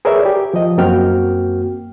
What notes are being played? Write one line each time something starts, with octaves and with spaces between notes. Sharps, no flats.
G#4 A#4 B4 C#5 D5 E5
G4
F3 D#5
F#2 A#3 C4 F#4 G5 F6